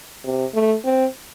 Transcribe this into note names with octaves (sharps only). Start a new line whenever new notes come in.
C3
A3
C4